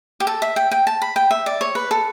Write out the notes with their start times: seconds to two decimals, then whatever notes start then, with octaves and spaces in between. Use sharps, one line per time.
0.20 G4
0.27 A4
0.42 E5
0.56 G5
0.71 G5
0.87 A5
1.02 B5
1.16 G5
1.31 E5
1.46 D5
1.61 C#5
1.75 B4
1.91 A4